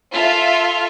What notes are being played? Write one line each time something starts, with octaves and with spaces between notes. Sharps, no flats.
F4 A4 E5